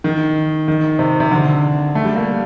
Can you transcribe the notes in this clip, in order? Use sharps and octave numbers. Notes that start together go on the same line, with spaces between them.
D#3
D#3
C3
C3
D3
A3
G3
A#3